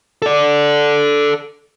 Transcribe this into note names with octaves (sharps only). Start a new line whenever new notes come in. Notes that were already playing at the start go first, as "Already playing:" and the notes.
A4 D5